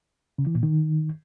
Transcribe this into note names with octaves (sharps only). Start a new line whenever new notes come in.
C#3
E3
A#2
D#3